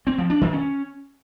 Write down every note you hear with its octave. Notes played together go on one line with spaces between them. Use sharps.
C4
F3
D4
D#3
C#4